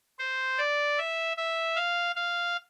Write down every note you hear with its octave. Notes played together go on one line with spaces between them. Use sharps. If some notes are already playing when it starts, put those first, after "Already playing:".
C5
D5
E5
E5
F5
F5